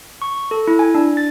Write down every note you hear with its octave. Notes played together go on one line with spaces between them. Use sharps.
C#6
A4
E4
G#5
D4
A6